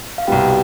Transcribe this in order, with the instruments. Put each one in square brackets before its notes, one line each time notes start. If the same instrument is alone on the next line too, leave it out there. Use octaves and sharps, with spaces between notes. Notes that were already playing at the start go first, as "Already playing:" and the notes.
[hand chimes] F5
[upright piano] C2 B2 G3 [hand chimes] G4 G5